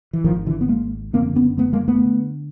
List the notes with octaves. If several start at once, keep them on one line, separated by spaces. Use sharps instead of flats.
E3
G#1 G#2 D#3 F3
D3 E3
B3
G#3 A#3
F#1 F2 D3 A#3 C4
B3 C#4
A3 B3
G#3 A#3
A3 B3
D3